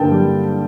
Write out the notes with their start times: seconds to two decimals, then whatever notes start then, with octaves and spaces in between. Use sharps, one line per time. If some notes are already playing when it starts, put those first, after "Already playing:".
Already playing: G2 D3 A#3 G5 A5
0.11 G3